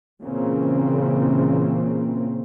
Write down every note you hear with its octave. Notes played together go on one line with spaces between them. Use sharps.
A#2 C#3 E3 A#3 C4